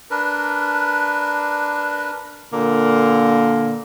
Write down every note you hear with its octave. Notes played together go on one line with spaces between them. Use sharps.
D4 A#4 B4
A#2 D3 A#3